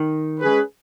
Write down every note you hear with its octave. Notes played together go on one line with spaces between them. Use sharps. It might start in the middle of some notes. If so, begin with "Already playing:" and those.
Already playing: D#3
G#3 C#4 G#4 B4